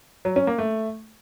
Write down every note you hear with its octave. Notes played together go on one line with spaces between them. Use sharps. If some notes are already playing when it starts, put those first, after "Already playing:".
F#3
C#4
A#3
A3